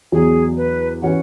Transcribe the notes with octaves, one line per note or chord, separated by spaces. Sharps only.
E2 B2 F#3 G#4
B4
E3 C#4 F#4 B4 F#5